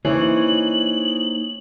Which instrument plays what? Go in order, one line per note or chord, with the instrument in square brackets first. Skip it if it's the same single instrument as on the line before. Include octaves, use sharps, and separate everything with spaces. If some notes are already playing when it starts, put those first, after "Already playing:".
[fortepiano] E3 [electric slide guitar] A#3 D#4 C5 [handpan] C#5 [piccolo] F#7